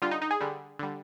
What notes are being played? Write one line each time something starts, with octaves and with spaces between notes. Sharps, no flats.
D3 G3 F4
D#4
D#4
G#4
D3 G3
D3 G3